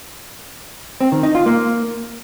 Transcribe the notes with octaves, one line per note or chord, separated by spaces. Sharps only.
C4
D#3
D#4
F4
A#3